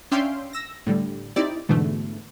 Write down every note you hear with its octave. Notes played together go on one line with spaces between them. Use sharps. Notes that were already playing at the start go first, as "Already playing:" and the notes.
C#4 D4 E5 F5 G5 C6
E6 A#6
A2 D3 G3
C4 D#4 E4 G4 D5
G#2 B2 D3 E3 A3